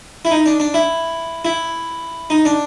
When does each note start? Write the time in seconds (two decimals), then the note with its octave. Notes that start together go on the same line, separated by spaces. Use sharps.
0.25 E4
0.31 D#4
0.46 D4
0.60 D4
0.74 E4
1.45 E4
2.30 D#4
2.45 D4